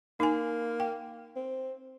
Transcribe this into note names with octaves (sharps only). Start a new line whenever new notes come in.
A#3 D#4 G#5
G5
C4